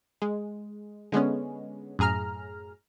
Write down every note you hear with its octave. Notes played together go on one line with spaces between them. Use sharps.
G#3
D3 G#3 B3 C#4
F#2 A2 G#4 A#5 F6